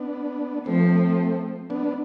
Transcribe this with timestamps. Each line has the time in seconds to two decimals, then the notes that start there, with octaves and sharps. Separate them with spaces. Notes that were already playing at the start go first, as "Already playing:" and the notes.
Already playing: B3 D4
0.66 F3 A3 C4
1.70 B3 D4